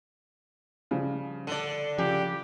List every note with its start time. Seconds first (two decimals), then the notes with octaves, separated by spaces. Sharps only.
0.91 C#3 F3 G3
1.47 D3 D5 D#7
1.98 C#3 F3 G4